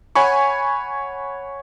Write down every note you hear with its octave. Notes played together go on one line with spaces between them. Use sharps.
C#5 F#5 G#5 B5 C#6